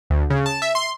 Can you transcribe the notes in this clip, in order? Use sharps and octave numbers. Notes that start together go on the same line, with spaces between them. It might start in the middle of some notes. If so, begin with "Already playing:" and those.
D2
C#3
A5
E5
C6